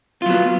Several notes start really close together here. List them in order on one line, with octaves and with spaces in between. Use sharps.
F4 F#3 B3